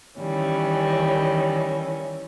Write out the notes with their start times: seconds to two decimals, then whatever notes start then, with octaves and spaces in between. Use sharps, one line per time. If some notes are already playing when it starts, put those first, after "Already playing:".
0.19 D#3 E3 G3 C#4